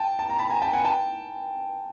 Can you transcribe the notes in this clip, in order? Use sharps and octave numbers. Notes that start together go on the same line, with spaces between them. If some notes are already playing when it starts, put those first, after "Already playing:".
Already playing: G5 A5
A5
A#5
A5 B5
G#5 A#5
G5 A5
F#5 G#5
G5 A5